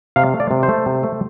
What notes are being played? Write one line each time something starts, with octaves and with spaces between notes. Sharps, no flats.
C3 F5
A3
D5
C3
C5
A3
C3
A3